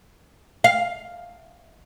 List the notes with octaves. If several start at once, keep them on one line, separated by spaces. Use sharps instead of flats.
F5